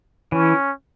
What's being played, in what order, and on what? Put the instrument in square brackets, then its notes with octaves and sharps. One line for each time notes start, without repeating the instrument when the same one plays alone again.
[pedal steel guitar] E3 [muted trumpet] C#4